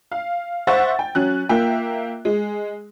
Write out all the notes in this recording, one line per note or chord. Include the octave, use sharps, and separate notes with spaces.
F5
C5 E5 F#5 C#6 A6
G5
F#3 C#4 F#6
A#3 F4 E5 G5
G#3